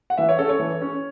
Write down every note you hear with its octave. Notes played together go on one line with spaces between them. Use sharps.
F#5
E3 E5
C#5
C#4 A4
C#5
E3
C#4